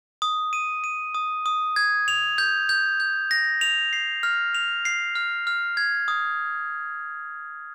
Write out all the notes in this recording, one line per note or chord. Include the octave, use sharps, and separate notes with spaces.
D#6
D#7
D#7
D#6
D#6
G#6
F7
G6
G6
G6
A#6
F7
C7
F6
F7
C7
F6
F6
G#6
D#6